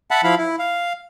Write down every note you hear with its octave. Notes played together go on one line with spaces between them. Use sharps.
E5 F#5 A5 B5
F3 E4 F5 B5
E4
F5